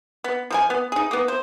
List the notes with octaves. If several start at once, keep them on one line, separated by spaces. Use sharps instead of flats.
B3
F3 A4 G#5
B3
D#4 G#4
A#3 B3
C5